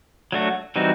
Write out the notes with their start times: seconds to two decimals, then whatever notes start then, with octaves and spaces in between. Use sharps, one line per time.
0.32 F#3 A3 D4 F#4
0.76 E3 G3 C4 D#4 F#4